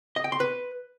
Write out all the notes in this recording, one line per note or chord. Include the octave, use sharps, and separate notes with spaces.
D#5
G5
C6
B4